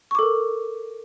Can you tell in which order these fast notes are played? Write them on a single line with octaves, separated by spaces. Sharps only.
C#6 D6 A4 A#4